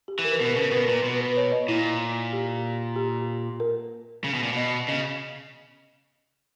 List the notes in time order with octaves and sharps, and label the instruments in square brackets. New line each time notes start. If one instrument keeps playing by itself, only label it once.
[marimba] G4
[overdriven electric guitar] E3
[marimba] A#4
B4
[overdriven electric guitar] B2 [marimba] A#4
[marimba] B4
[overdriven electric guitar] C#3 [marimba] A#4
[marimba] B4
[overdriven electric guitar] B2 [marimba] A#4
[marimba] B4
[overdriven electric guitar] A#2 [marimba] A#4
[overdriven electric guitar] B2 [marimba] B4
[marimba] B4
C#5
D#5
[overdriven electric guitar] A#2 [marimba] E4
[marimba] G4
G4
A#4
[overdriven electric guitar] C#3
B2
A#2
[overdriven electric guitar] B2 [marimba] D#5
[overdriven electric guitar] C#3 [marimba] D#5